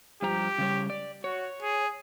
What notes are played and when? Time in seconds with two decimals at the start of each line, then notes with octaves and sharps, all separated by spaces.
0.22 G2 F3 G4 A#5
0.58 C#3 G3 C#5
0.90 D5
1.24 F#4 C#5
1.63 G#4